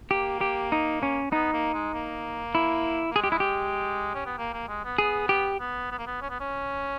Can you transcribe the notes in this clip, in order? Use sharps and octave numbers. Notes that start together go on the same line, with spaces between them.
A#3 G4
G4
D#4
C#4
B3 D#4
A#3
G#3
A#3
E4
A#3
G#3 G#4
G4
E4
G4
C#4
B3
A#3
A#3
G#3
B3
B3 G#4
G4
B3
B3
A#3
B3
C#4
B3
C#4